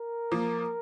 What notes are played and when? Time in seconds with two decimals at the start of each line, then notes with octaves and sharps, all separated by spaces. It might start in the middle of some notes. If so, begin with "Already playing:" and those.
Already playing: A#4
0.32 F3 A#3